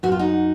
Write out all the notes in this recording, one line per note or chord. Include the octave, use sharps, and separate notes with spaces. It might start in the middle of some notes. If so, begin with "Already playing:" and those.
F#2 F#4
F4
D#4 F#4